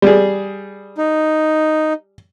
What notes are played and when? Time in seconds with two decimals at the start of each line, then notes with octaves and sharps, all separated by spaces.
0.02 G3 G#4
0.98 D#4